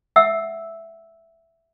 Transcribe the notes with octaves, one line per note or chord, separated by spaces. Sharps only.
E5 F#5 E6